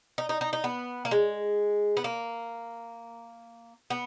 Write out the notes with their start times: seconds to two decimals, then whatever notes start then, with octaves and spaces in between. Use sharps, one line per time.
0.18 D#4
0.29 D#4
0.41 D#4
0.53 D#4
0.64 B3
1.05 A#3
1.11 G#3
1.97 B3
2.04 A#3
3.90 B3